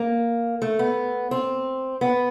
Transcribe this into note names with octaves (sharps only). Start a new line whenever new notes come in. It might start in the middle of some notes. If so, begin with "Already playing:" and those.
Already playing: A#3
A3
B3
C4
B3